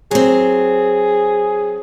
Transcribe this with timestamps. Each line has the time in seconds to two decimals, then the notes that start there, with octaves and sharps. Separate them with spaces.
0.11 F#3 C4 G#4